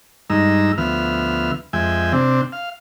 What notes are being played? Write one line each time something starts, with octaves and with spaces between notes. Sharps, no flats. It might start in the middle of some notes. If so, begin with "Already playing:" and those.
G2 G#3 D#4 A#5 E6
D2 F3 B3 E5 F6
F2 G#3 E5 G5 G#5
C3 C4 D4
F5